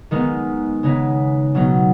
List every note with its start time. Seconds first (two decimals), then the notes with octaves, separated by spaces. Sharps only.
0.11 D#3 G#3 B3 D#4
0.83 C#3 G#3 B3 D#4
1.55 B2 F#3 B3 D#4